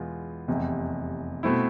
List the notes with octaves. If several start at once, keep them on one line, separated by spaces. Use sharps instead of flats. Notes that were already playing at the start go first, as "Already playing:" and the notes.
Already playing: E2 B2 G#3 B3 F4
F1 E2 C3
B2 A3 C4 E4